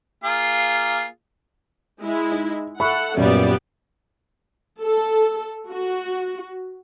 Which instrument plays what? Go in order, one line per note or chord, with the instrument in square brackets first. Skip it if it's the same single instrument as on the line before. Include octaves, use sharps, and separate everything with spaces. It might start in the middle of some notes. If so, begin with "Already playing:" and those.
[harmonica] A#3 F4 G#4
[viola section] G#3 E4
[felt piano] D#4
[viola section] A4 F#5 [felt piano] E5 B5 C#6
[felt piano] F#2 A#2 [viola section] G3 B3 D5
[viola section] A4
F#4